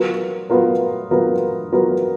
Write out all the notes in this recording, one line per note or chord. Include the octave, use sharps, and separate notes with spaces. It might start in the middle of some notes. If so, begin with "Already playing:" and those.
Already playing: F#3 B3 F4 A#4
F#3 B3 F4 A#4
F#3 B3 F4 A#4
F#3 B3 F4 A#4